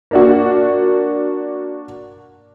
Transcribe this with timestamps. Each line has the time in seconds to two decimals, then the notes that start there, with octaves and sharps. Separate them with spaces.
0.11 A#3 D4 F#4